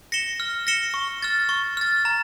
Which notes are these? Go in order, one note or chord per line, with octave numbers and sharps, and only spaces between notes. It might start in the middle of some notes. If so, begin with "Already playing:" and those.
A#6 C#7 E7 G7
F6
A#6 C#7 E7 G7
C#6
F6 A6
C#6
F6 A6
A#5